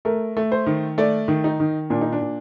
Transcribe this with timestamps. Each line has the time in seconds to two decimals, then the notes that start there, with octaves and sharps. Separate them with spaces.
0.05 A3 A#4
0.37 A3
0.52 C5
0.66 D#3
0.98 A3 D5
1.28 D#3
1.44 D#4
1.60 D#3
1.90 A#2 D4
2.01 D#4
2.12 D4
2.21 A#2